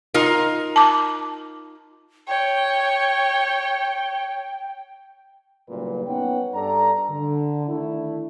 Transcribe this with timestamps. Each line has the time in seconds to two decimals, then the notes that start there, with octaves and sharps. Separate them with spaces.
0.14 D#4 F4 A#4
0.76 A5 D6
2.28 C#5 G5
5.69 F#1 B1 F#2 A#2 G3 B4
6.07 B3 C#4 D#4 B4 F#5 G5
6.54 G2 A4 D5 A#5
7.10 D3
7.68 D#3 A3 D4 E4